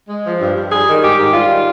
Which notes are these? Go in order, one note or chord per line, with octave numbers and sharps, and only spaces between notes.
G#3
F3
G2
G2
G3 G#4
D#3
G#2 G4
G#2
G3 F4
D#3